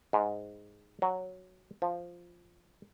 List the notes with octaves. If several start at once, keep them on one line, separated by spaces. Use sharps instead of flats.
G#2
F#3
F3